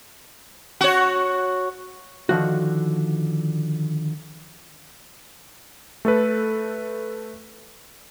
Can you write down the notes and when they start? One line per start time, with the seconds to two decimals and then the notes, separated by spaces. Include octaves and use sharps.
0.81 F#4 C#5
2.29 D3 D#3 F3 F#4
6.05 A3 A4 B4